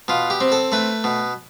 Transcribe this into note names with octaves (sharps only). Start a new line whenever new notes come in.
B2 F4
G4
C4
A4
A3 B4
B2